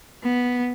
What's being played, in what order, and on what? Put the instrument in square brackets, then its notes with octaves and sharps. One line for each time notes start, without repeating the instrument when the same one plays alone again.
[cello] B3